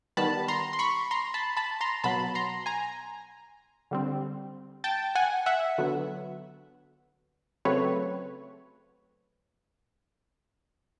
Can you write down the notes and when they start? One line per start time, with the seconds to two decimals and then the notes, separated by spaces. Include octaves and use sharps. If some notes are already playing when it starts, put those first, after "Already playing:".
0.17 D#3 G3 B3 A5 B5
0.48 A#5 C6
0.73 C6
0.79 B5 C#6
1.11 A#5 C6
1.34 A5 B5
1.57 A5 B5
1.81 A#5 C6
2.04 B2 F#3 B3 A5 B5
2.35 A#5 C6
2.66 G#5 A#5
3.91 D3 G3 C4
4.84 G5 A5
5.15 F#5 G#5
5.46 E5 F#5
5.78 D3 F#3 B3
7.65 C#3 F#3 A3 C4 B4 C#5